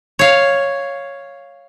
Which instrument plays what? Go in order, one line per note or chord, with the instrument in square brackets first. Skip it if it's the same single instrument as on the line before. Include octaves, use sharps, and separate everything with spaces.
[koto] C#5 F5